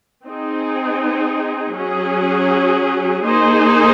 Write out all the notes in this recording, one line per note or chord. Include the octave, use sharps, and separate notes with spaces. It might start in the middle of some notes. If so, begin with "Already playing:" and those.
C4 D#4 G#4
F#3 C#4 G#4
A#3 D#4 G#4 C5